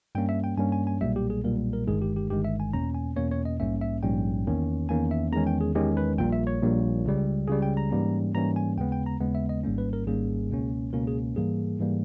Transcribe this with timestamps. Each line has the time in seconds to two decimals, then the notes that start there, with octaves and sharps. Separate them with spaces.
0.15 G2 G3 A#3 C#4 G5
0.29 E5
0.44 G5
0.57 G2 G3 A#3 C#4 G#5
0.72 G#5
0.87 G#5
1.01 B1 A#2 G3 A#3 E5
1.16 G4
1.30 G#4
1.44 B1 A#2 G3 A#3 A#4
1.73 A#4
1.87 G1 G2 D#3 G#3 G#4
2.02 G4
2.16 G4
2.30 G1 G2 D#3 G#3 G4
2.45 E5
2.60 G#5
2.73 E2 B2 A#3 C#4 A#5
2.95 G#5
3.16 E2 B2 A#3 C#4 C#5
3.31 C#5
3.45 D#5
3.60 A#1 G#2 G3 A#3 C#4 E5
3.81 E5
4.03 A#1 G#2 G3 A#3 C#4 G5
4.47 E2 D#3 A#3 C#4
4.89 E2 D#3 A#3 C#4 G#5
5.11 E5
5.33 E2 D#3 G#3 C#4 A#5
5.47 G5
5.61 G#4
5.75 E2 D#3 G#3 C#4 G4
5.97 B4
6.18 A#1 A#2 G3 A#3 G5
6.32 E5
6.47 C#5
6.62 A#1 A#2 G3 A#3
7.05 C#2 C#3 G3
7.48 C#2 C#3 G3 G#4
7.62 G5
7.77 A#5
7.91 G#2 E3 G3 A#3 C#4
8.34 G#2 E3 G3 A#3 C#4 A#5
8.56 G#5
8.78 D#2 C#3 G#3 B3 G5
8.92 G5
9.06 A#5
9.20 D#2 C#3 G#3 B3
9.35 E5
9.49 D#5
9.64 G#1 G#2 G3 A#3 C#4
9.78 B4
9.93 A#4
10.06 G#1 G#2 G3 A#3 C#4 G#4
10.50 C#2 B2 A#3 C#4
10.93 C#2 B2 A#3 C#4 A#4
11.07 G#4
11.36 G#2 E3 G3 A#3 G#4
11.79 G#2 E3 G3 A#3